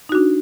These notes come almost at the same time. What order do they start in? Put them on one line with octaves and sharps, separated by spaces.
D#4 F#4 D4